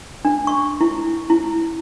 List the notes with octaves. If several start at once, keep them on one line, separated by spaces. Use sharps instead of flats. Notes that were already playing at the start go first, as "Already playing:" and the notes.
D4
C#6
E4
E4